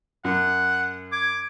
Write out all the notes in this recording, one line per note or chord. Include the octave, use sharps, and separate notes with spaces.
F#2 F#5
D6 G#6